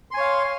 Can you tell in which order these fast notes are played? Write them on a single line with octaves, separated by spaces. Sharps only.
C6 G#5 C#5 F5